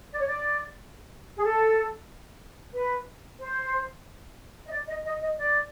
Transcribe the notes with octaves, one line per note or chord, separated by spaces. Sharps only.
D5
C#5
D5
G#4
A4
B4
C5
D#5
D5
D#5
D#5
D#5
D5